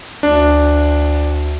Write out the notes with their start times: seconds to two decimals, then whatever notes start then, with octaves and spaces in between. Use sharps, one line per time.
0.23 D2 D4